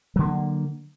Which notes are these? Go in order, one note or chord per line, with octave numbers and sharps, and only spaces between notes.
D3 F#3 A#3